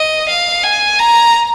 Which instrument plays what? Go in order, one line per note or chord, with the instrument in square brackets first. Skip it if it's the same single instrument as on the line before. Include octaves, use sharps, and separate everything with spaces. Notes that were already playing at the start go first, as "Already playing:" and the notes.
Already playing: [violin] D#5
F5
G#5
A#5